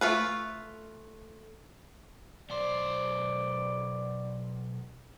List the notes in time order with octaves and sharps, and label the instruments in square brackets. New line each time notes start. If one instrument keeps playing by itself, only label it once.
[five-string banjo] A3 F4 B4
[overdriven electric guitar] B1 C5 [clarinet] D5